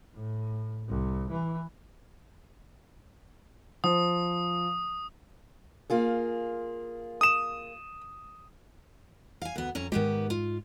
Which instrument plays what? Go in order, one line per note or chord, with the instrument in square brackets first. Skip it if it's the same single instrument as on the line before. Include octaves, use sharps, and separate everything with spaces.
[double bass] A2
C2
E3
[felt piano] F3 [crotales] D#6
[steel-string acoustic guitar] A#3 F4 G#4
[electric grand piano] D#6 E7
[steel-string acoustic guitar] F5 G#5
D2 B3
F2 C#4 A#5
[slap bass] G#2 G#3 [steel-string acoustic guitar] D#3 B3 G4
[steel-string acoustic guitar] F4